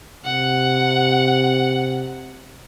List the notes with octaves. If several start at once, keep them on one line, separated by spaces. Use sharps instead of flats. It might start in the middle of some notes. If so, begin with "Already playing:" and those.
C3 F#5